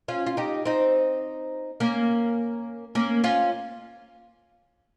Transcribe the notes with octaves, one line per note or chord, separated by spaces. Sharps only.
C#4 F4
F4
D#4 G4
C4 D#4
A#3 C#4
A#3 C#4
C#4 F4